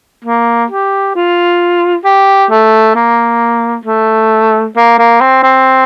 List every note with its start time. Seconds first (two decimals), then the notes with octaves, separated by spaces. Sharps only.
0.25 A#3
0.70 G4
1.15 F4
2.05 G4
2.51 A3
2.95 A#3
3.85 A3
4.76 A#3
4.99 A#3
5.21 C4
5.43 C4